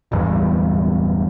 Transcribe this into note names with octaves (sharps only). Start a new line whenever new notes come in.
D1 G1 E2 G2